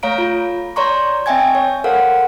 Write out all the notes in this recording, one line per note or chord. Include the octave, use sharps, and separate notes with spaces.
A3 C#5 F5 A#5 D7
F4
C#5 D5 A#5 C6 C#6
C4 D#5 E5 G5 G#5 G#6
C#5
A4 A#4 C5 F5 F#5